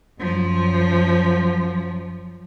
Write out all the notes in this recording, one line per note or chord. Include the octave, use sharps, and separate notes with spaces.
F#2 F3